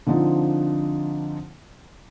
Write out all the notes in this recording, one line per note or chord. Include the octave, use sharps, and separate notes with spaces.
D3 F3 C4 D4 D#4 F4